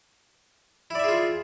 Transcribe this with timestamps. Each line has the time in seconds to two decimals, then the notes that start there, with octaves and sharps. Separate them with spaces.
0.90 E4
0.95 D5
0.99 E5
1.04 G#4
1.08 F4